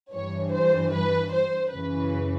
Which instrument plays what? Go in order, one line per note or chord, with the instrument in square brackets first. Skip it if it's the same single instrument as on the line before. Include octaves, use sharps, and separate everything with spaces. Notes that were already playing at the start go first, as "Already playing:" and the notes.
[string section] G2 E3 C#5
C5
B4
C5
F#2 C#3 E3 B4